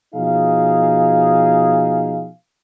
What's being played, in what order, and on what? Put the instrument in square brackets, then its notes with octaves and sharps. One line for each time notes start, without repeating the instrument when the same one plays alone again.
[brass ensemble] B2 F3 D#4 G#4 F5